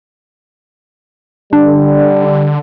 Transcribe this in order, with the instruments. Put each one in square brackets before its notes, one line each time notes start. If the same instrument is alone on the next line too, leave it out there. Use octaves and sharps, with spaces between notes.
[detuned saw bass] D3 [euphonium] G3 [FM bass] D4